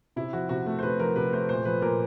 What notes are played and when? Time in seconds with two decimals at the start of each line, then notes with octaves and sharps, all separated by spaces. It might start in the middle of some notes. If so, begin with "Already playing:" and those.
0.16 C3 E4
0.33 F3 F#4
0.49 C3 F#4
0.66 A3
0.79 C5
0.83 C3 B4
1.00 F3 A#4
1.16 C3 B4
1.33 A3 C5
1.49 A#2 C5
1.65 F3 B4
1.82 A#2 A#4